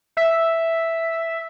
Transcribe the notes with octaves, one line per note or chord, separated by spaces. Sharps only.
E5